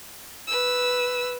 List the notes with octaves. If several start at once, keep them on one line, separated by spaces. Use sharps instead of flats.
B4 E6